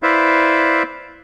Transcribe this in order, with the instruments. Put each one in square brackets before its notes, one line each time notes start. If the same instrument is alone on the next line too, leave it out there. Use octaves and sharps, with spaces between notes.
[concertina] E4 B4 C5 D5 E5 F5